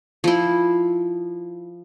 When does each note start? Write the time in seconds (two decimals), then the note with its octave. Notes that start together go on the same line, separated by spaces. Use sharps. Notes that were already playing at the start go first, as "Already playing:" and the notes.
0.24 F3 E4